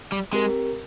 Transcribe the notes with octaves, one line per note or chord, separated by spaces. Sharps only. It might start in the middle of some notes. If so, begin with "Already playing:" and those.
G3
G#3 C4 G4 A#4